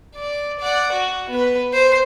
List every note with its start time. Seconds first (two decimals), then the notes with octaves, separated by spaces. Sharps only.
0.16 D5
0.60 D5 F#5
0.93 F#4
1.30 B3 B4
1.73 C5